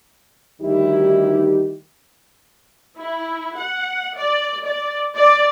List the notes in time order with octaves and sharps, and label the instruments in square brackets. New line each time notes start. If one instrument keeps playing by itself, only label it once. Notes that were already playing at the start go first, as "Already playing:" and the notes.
[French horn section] D2 D#3 G3 D#4 E4 G4
[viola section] E4
F#5
D5
D5
D5